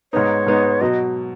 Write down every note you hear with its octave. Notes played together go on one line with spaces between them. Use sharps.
G#2 G#3 B3 D#4 C#5
G#2 G#3 B3 D#4
B2 F#3 D#5